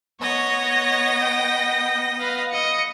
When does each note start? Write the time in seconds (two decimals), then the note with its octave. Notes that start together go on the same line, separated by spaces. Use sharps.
0.20 B3 C#5 D#5 A#6
1.21 G5
2.20 B4 F5
2.52 D#5 C#7